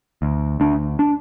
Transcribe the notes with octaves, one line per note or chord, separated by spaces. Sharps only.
D2
D2 D4
D4